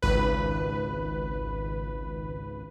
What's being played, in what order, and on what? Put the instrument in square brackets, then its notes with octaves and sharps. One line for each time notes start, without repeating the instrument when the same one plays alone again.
[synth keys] G#1 C#2 B4